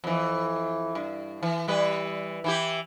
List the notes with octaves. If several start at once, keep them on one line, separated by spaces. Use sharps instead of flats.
F2 E3
G2
E3
E3 G3 B4
E3 E4 G4